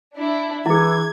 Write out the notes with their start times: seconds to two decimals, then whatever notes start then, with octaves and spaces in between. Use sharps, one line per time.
0.14 D4 E4
0.66 E3 E4 G#4 G#6